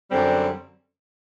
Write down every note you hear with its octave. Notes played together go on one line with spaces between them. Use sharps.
F#2 D3 G3 C4